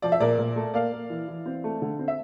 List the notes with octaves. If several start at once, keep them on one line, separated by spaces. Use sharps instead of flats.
F3 D5
E5
A#2 A#4 D5
A#2
A3
A#3 D5 F5
A#3
E3
E3
C4
A3
D3
C4
E5